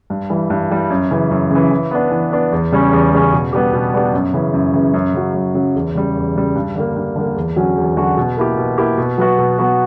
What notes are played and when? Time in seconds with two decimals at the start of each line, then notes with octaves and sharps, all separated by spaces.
0.10 G2
0.30 E3 G3
0.50 G2
0.71 E3 G3
0.90 F#2
1.11 C#3 E3
1.31 F#2
1.51 C#3 E3
1.71 E3
1.91 B3 D4
2.11 E3
2.32 B3 D4
2.52 E2
2.72 C#3 G3 C#4
2.92 E2
3.13 C#3 G3 C#4
3.33 B2
3.53 G3 B3 D4 G4
3.73 B2
3.94 G3 B3 D4 G4
4.13 F#2
4.34 C#3 E3
4.54 F#2
4.74 C#3 E3
4.94 F#2
5.14 C#3 F#3
5.34 F#2
5.55 C#3 F#3
5.75 E2
5.95 C#3 G3
6.15 E2
6.36 C#3 G3
6.55 G2
6.75 D3 G3 A#3
6.96 G2
7.16 D3 G3 A#3
7.36 E2
7.56 D3 F#3 C#4 F#4
7.77 E2
7.97 D3 F#3 C#4 F#4
8.17 B2
8.37 A#3 E4 G4
8.57 B2
8.78 A#3 E4 G4
8.98 B2
9.18 F#3 B3 F#4
9.38 B2
9.58 F#3 B3 F#4